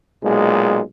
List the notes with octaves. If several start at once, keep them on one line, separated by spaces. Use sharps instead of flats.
B1 A#2 G#3